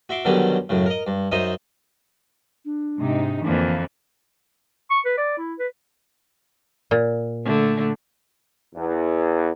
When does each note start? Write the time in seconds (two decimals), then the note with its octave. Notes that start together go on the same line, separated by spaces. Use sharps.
0.09 F#4 E5 C6 D6
0.25 B2 D3 D#3 F#3 G3 C#4
0.69 F#2 A2 C#3
0.86 A#4 D#5
1.07 G2
1.31 F#2 D#4 C5 D#5 E5 D#6
2.65 D4
3.00 G#2 C3 D#4
3.44 F2 D3 E3 A#3
4.91 C#6
5.05 B4
5.18 D5
5.38 E4
5.59 B4
6.91 A#2
7.45 D3 A3
8.75 E2